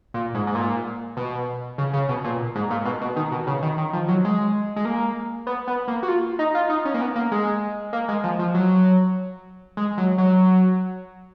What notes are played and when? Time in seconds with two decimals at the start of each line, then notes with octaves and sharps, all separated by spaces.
0.14 A#2
0.35 G#2
0.47 G#2
0.55 A#2
1.17 B2
1.78 C#3
1.93 C#3
2.09 B2
2.24 A#2
2.55 G#2
2.70 A#2
2.85 B2
3.01 B2
3.16 D#3
3.32 B2
3.47 C#3
3.62 D#3
3.78 D#3
3.93 F3
4.08 F#3
4.25 G#3
4.76 G#3
4.85 A#3
5.47 B3
5.67 B3
5.88 A#3
6.03 F#4
6.08 F4
6.39 D#4
6.55 F4
6.69 D#4
6.85 C#4
6.94 A#3
7.01 B3
7.15 A#3
7.32 G#3
7.93 A#3
8.08 G#3
8.24 F3
8.39 F3
8.55 F#3
9.77 G#3
9.98 F#3
10.18 F#3